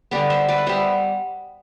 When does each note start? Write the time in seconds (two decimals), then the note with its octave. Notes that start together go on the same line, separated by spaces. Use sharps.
0.11 D3 G3 B3 B4 D5
0.30 C5 E5
0.49 B4 D5
0.58 F#5
0.66 G3 B3 C5 E5